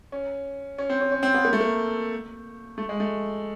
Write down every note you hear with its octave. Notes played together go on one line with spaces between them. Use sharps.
C#4
C#4
C4
C#4
C#4
C4
B3
A#3
A3
A#3
A3
G#3
A3